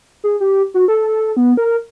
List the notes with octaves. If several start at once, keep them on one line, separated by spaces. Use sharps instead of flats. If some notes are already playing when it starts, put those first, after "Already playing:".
G#4
G4
F#4
A4
B3
A#4